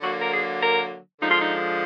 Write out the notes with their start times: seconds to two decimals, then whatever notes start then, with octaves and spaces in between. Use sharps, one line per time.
0.02 D3 F#3 A#3 F#4
0.21 A#4
0.31 G#4
0.61 A#4
1.20 D3 F3 G#3 D#4
1.30 F4
1.39 D#4